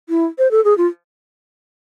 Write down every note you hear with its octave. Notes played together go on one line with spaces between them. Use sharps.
E4
C5
A4
G#4
F4